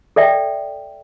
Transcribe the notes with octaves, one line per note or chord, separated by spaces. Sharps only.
A4 D5 E5 G5